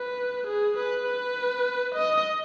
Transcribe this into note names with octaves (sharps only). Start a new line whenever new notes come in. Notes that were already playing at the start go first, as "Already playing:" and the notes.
Already playing: B4
G#4
B4
B4
D#5